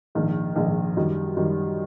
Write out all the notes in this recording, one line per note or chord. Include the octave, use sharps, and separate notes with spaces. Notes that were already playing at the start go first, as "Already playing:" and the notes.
A#1 G#2 D#3
A#1 G#2 D#3
F#2 D#3 G3
F#2 D#3 G3